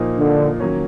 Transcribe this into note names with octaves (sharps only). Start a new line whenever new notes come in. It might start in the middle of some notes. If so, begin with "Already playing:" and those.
Already playing: A#2 F3 A#3 D#4
D3
D#3 F#3 A#3 C#4